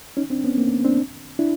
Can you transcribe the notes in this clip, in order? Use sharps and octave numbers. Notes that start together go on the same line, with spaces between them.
C#4 D#4
C4 D4
B3 C#4
A#3 C4
C4 D4
D4 E4